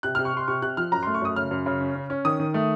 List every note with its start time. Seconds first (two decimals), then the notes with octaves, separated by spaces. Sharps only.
0.03 C3 F#6
0.15 C3 F6
0.25 C#6
0.33 C3 C6
0.48 C3 C#6
0.62 C3 F#6
0.77 F3 F6
0.92 F#2 A#5
1.03 A3 C6
1.15 C#6
1.22 F#2 D#6
1.36 C#3 F6
1.51 F#2
1.66 C#3
1.81 C#4
1.95 C#4
2.10 C#4
2.25 D#3 D#6
2.40 D#3
2.54 A3